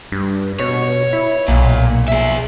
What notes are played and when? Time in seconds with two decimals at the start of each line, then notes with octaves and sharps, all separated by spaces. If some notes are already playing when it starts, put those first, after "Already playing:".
0.12 G2
0.60 B2 C#5
1.13 E4
1.48 B1 A#2
2.08 G#4 E5